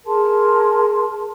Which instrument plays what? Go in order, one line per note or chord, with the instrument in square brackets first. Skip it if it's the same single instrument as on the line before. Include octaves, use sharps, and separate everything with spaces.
[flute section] G#4 A#4 A5 C6